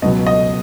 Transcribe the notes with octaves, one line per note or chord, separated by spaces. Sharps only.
C#2 B2 F#3 D#5
D#5